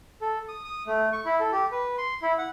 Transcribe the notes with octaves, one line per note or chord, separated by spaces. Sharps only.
A4
D#6
D#6
A3
C#6
E4
A4
G4
B4
C6
E4
F#5